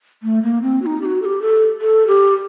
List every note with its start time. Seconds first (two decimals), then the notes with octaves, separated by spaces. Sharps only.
0.23 A3
0.43 A#3
0.62 C4
0.82 F#4
0.86 D#4
1.01 G4
1.05 F#4
1.22 A4
1.25 G4
1.42 A4
1.81 A4
2.07 G4